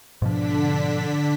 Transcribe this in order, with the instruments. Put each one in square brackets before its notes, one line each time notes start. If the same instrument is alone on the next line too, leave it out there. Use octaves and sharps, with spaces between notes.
[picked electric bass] G#2 B2 F3 [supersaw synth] D3 D4 B6